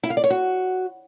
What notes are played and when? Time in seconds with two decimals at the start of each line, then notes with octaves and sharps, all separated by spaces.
0.03 E4
0.10 F5
0.17 D5
0.24 C#5
0.30 F#4